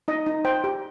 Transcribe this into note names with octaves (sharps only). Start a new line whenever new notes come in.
D#4 D#5
D#4
C5 G5
G4